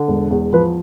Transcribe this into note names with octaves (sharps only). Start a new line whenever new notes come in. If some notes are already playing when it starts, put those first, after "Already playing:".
Already playing: D3
E1
E2
F3 B4